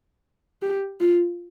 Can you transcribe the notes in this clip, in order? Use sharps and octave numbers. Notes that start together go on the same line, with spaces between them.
G4
F4